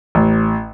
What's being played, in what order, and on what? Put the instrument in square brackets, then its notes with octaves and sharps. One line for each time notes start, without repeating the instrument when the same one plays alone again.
[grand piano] A1